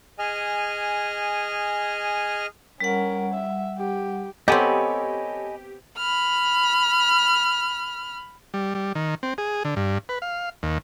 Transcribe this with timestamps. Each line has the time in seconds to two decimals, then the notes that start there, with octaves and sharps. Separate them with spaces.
0.19 G#4 D#5 G#5 F6
2.80 G3 C#4 A#4 F#5
3.34 E5
3.78 G4
4.48 B3 C4 G4 A4 C#5 D#5 G#5 B5
5.98 B5 F6
8.54 G3
8.75 G3
8.95 D#3
9.23 C4
9.38 G#4
9.65 D3
9.76 G2
10.09 B4
10.22 F5
10.63 D#2